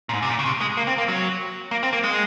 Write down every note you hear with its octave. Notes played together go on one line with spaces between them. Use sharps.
A#2
G#2
C3
A#2
C#3
C3
G#3
A#3
C4
A#3
F#3
A#3
C4
A#3
G#3